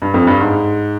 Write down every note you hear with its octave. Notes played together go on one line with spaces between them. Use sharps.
G2
F2
G2
G#2